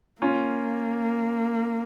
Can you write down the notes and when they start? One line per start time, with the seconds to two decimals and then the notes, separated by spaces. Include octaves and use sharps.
0.21 A#3 C#4 F4